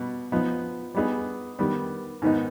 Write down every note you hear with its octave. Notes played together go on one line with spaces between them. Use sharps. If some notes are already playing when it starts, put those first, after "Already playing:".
Already playing: B2 G3 B3
F3 B3 D#4
G3 B3 D#4 G#4
D#3 G3 B3
G#2 D#3 B3 D#4